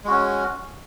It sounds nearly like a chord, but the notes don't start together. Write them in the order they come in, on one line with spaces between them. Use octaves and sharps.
G#3 F#4 C#4